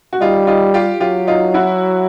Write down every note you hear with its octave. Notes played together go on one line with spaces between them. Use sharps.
F#4
G3 D#4 F4
D#4 F4
F4 G4
F#3 F4 G4
D#4 F4
E4 F#4